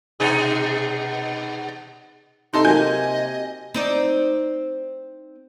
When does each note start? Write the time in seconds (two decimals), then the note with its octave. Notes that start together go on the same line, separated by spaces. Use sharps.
0.20 B2 D#4 G#4
2.54 C3 D#4 A4 C6
2.65 F#3 A#3 G4 D#5 G#5 G6
3.74 C4 D#4 D5